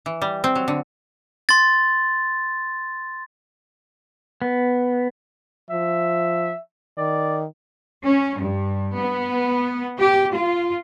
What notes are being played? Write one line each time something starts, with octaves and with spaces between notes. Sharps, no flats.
E3
G3
C4
F#3
D3
C6 A6
B3
F3 E5
D#3 D5
C#4
G2
B3
G4
F4